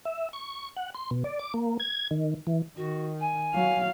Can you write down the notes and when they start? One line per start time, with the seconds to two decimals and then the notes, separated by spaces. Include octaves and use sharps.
0.06 E5
0.33 C#6
0.77 F#5
0.95 C6
1.11 B2
1.24 D5
1.39 D6
1.54 A#3
1.80 G#6
2.11 D#3
2.47 E3
2.77 D#3 F#4
3.20 G#5
3.55 F#3 F5